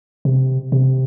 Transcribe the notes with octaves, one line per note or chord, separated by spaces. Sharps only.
C3
C3